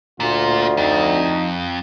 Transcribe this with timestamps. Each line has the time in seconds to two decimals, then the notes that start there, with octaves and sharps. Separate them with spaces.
0.20 D2 A#2 F4
0.77 F2 D#4